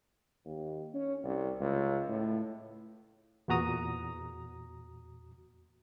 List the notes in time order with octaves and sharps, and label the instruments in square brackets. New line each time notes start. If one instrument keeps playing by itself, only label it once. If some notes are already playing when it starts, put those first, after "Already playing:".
[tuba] D#2
C#4
C2
C#2
A2
[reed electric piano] E2 A#2 F#4 A#5 D#6